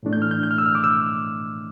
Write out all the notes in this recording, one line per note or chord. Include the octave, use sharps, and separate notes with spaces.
A2 E3 A3 D4
G6
F6
G6
G6
F6
E6
F6
D6
E6